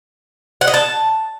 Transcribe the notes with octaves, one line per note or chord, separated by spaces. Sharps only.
F#5
D#5
A5